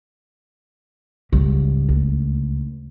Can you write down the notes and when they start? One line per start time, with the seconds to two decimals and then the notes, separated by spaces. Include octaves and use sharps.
1.32 C#2 G#2 G3
1.89 D2